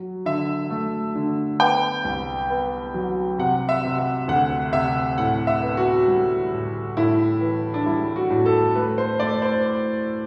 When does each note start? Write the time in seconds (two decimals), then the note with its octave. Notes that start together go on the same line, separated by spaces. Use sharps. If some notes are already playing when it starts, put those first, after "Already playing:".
Already playing: F#3
0.26 D3 E5
0.70 A3
1.15 D3
1.60 B3 G5
2.05 C2
2.50 B3
2.94 F#3
3.38 C3 F#5
3.69 E5
3.84 C3
3.98 E5
4.28 D2 F#5
4.73 C3 E5
5.18 A2 F#5
5.47 E5
5.62 B3
5.77 F#4
6.07 G3
6.52 A2
6.97 A2 E4
7.41 E3
7.74 D4
7.86 G3 E4
8.16 F#4
8.30 A2
8.46 A4
8.75 A3 B4
8.98 C5
9.20 A3 D5
9.42 C5